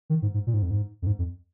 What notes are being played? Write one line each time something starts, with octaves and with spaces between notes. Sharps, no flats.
D#3
G#2
G#2
A#2
G#2
F2
G#2
F2
G#2
F2